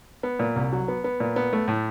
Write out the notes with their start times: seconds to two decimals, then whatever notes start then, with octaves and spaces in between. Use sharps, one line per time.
0.23 B3
0.39 A#2
0.56 C2
0.73 F#3
0.88 B3
1.04 B3
1.20 A#2
1.36 B3
1.53 A3
1.68 A2